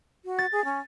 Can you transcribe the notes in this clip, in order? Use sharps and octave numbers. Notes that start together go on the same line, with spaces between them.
F#4
A6
G#4
C#4